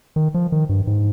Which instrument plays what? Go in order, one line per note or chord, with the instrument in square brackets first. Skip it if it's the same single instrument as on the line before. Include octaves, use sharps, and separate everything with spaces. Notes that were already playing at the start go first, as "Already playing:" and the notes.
[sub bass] D#3
F3
D#3
G2
G#2